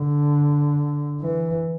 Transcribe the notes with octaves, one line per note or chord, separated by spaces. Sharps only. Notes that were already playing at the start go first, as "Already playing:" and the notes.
Already playing: D3
E3